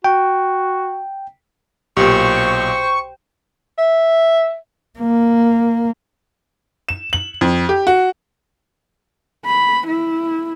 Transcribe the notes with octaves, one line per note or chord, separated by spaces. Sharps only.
F#4 G5
B1 A#2 G4 C5 G5 C#6
E5
A#3
E7
F#7
F2
G4
F#4
B5
E4